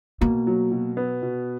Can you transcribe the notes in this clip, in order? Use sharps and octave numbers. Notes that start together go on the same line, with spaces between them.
B2 A#3
F#3
B2
B3
B2